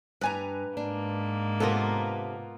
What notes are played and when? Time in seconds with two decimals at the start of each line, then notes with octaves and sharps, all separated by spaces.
0.21 G2 B4 G#5 A#5
0.77 G#2 A#3 D4
1.60 C3 B3 F4 A4 A#4